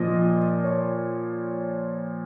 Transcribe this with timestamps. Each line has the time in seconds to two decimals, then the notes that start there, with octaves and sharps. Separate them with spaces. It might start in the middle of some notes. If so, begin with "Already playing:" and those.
Already playing: A#2 F3 D#5
0.64 C#5